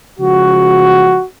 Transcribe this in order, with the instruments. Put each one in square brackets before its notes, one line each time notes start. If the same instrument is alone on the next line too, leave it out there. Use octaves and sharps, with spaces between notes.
[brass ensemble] C#3 F3 G#3 F#4